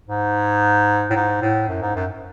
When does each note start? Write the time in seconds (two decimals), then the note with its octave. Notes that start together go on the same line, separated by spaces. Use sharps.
0.08 G#2
1.10 A2
1.16 G#2
1.42 A2
1.68 F#2
1.82 G#2
1.96 F#2